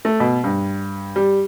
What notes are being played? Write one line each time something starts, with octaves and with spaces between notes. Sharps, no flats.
A3
B2
G2
G3